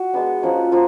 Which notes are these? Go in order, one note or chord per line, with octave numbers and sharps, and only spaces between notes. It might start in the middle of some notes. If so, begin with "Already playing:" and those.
Already playing: F#4
G#3 B3 D4
F3 A#3 C#4
F3 A#3 F4